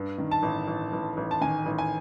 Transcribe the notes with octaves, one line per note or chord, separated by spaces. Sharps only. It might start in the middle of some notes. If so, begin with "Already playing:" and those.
Already playing: G2
D#3
A5
A1
A1
A1
A1
A5
D#3 G#5
A1
G#5